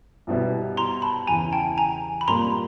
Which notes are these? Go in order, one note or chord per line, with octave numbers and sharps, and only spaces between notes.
C2 B2 G3 B3 E4
A#5 C6
A5 B5
E2 C#3 E3 G#5 A#5
G5 A5
G#5 A#5
B5
A#2 G3 A#3 A#5 C6